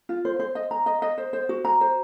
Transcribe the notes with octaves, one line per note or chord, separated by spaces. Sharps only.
F4
C5
C5
D#5
A#5
D#5
D#5
C5
C5
F#4
A#5
C5